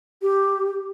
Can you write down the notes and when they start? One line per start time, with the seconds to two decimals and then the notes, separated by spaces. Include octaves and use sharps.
0.22 G4